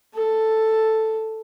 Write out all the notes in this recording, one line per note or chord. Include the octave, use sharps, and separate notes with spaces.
A4